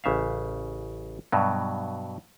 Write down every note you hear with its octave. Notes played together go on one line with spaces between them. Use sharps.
A1 C#3 E5 F5
G2 B2 F#3